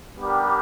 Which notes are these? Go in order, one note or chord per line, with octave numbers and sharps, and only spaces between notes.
G3 B3 D4 G4 A#4